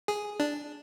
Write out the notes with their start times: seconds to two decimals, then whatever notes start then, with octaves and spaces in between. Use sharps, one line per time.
0.08 G#4
0.40 D4